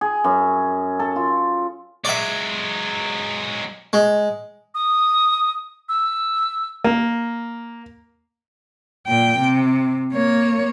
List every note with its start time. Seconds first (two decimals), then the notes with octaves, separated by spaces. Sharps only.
0.01 G#4
0.24 F#2
0.99 A4
1.16 F4
2.05 F#3 G#3 D5 E5
3.93 G#3
4.74 D#6
5.89 E6
6.84 A#3
9.07 A#2 G5
9.38 C3
10.13 A#3 C#5